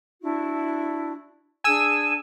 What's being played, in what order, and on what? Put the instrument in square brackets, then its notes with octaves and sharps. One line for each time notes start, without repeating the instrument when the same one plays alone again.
[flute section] D4 E4 F#4
[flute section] D4 G#4 [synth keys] G#5 E6 [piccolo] D#7